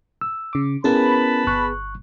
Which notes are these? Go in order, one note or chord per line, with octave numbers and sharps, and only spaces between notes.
E6
C#3 D6
B3 C#4 E4 G#4 A#4 B4 A5 B5
G1 C#6 F#6